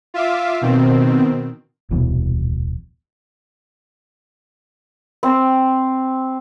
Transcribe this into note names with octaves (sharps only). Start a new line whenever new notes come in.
F4 E5 F5 D6
B2 D#3 C4
D#1 C2 B2 E3
C4